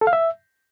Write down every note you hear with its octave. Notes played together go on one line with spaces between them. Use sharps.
A4
F5
E5